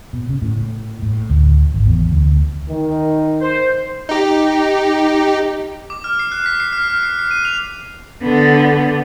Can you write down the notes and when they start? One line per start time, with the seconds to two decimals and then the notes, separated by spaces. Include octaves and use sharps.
0.13 B2
0.29 C#3
0.42 A2
1.02 A2
1.30 D2
1.74 G#1
1.86 E2
2.11 D2
2.69 D#3
3.41 C5
4.09 D#4 G4
5.90 D6
6.04 F6
6.19 C7
6.32 F#6
6.46 B6
6.60 C7
6.73 F6
6.88 F6
7.03 C7
7.19 C7
7.31 D#7
7.45 F7
8.24 D3 B3